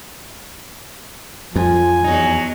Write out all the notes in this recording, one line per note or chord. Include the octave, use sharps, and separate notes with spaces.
F2 F3 G#5
E2 F#3 D#4